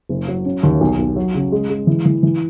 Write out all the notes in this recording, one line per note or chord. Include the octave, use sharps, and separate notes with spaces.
F#1
F#3
C#4
D#2
B1
B1
F#3
C#3
G#3
G#3
E3
E3
E3